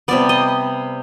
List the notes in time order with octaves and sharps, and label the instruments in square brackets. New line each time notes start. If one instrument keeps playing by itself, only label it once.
[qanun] C3 G3 B3 D5
D#5